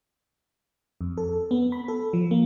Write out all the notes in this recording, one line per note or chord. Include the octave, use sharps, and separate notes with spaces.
F2
A4
B3
B5
A4
F3
A#3